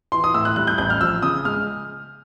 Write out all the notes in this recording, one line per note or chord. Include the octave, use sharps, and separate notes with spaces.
E3 C6
D#6
A2 E6
F#6
G3 F#6
G6
A1 G6
F6
F3 E6
C#3 D#6
G#3 F6